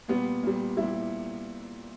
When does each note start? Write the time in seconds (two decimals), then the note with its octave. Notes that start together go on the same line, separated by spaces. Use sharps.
0.08 A#2 G3 B3
0.43 A#2 G3
0.77 A#2 G3 E4